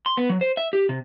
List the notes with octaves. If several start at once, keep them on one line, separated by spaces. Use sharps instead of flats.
C6
B3
F#3
C5
E5
G4
C3